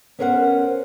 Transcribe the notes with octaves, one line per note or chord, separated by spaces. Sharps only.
B3 C#4 A#4 C5 D#5 F#5